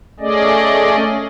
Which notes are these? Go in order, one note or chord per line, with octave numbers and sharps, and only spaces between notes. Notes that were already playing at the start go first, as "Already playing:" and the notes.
A3 C#4 G#4 D5 D#5